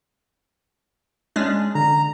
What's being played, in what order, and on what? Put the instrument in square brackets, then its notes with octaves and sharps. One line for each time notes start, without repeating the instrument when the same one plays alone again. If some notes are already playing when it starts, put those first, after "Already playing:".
[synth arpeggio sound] G#3 C#4 D4
[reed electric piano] D3 [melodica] A#5